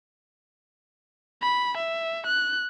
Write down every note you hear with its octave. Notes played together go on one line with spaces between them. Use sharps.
B5
E5
F#6